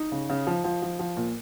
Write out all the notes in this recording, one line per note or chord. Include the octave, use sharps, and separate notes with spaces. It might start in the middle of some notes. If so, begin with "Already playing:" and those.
Already playing: D#4
C#3
C#3
F3
F3
F3
F3
A#2